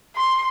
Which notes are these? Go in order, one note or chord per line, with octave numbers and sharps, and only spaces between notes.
C6